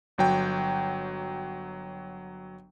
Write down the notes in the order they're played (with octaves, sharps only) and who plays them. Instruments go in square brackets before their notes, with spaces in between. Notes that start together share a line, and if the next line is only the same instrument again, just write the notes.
[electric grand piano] G1 F#3 G5